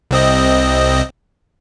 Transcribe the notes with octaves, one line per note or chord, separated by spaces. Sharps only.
C2 C4 D#5